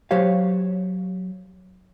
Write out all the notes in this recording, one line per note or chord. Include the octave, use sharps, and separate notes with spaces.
F#3 G4 C5 C#5 F5